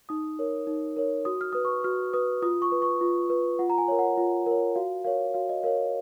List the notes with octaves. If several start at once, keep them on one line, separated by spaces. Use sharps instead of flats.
D#4 D#6
A#4 C#5
D#4
A#4 C#5
F#4 D#6
F6
B4 D#6
C#6
F#4 F6
B4 D#6
F4 D#6
C#6
B4
C#6
F4
B4
F4 F#5
A#5
G#5
A#4 C#5
F#5
F4
A#4 C#5
F#4 F5
A#4 C#5 F5
F#4 F5
D#5
A#4 C#5 F5